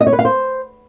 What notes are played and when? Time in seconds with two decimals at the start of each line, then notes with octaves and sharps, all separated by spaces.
0.01 D#5
0.07 C#5
0.13 B4
0.19 F5
0.25 C5